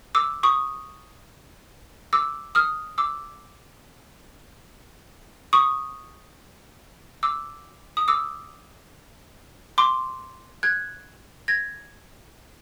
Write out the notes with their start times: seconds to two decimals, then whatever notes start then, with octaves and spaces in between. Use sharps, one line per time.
0.15 D6 E6
0.43 C#6 D#6
2.13 D6 E6
2.55 D#6 F6
2.98 D6 E6
5.53 C#6 D#6
7.23 D6 E6
7.97 D#6
8.08 D6 E6
9.78 C6 D6
10.63 F#6 G#6
11.48 G#6 A#6